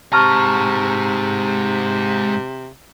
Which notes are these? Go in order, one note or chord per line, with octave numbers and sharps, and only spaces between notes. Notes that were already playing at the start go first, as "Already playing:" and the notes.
G#2 C3 A5 A#5 C#6 F6